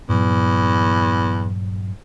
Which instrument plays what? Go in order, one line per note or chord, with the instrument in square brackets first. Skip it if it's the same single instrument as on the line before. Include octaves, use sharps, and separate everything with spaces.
[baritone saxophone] E2 [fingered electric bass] G2 A#2 F#3